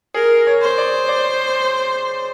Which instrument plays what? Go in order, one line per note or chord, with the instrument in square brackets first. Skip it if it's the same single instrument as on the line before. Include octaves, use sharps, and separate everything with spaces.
[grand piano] G#4 [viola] A#4
[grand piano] C#5
[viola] C5
[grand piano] D5
D5